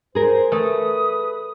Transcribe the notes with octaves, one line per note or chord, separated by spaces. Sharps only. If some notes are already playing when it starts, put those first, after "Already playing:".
G#4 A#4 C5
A3 A4 B4 D#6